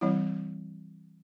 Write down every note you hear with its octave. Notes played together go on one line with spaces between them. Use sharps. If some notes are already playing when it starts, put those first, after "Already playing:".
E3 G3 C4 E4 C#5